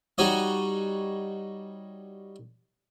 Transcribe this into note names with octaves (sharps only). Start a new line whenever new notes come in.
G3 D#4 F#4 C#5 D#5